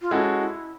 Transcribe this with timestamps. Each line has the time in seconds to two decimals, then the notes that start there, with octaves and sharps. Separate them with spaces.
0.02 F4
0.11 G#3 C#4 E4 F#4 A4
0.40 E4